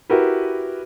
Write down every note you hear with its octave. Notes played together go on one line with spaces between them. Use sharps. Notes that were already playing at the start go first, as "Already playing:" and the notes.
E4 F#4 G4 A#4 B4